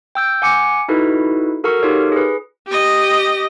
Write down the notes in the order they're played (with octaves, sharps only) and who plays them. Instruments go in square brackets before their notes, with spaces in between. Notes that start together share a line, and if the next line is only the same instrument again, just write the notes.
[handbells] G5 E6 G6
F#5 G#5 D6 C#7
D#4 E4 F#4 A4 B4
F#4 A4 A#4 F#5 A#5 C#6
D#4 F4 G4 A4 A#4 C#5
G#4 B4
[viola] G4 D#5